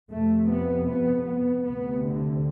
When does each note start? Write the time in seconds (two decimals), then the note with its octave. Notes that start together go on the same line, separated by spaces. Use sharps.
0.10 F2 C3 A3
0.49 B3
0.88 B3
1.27 B3
1.66 D2 C3 B3
2.05 D3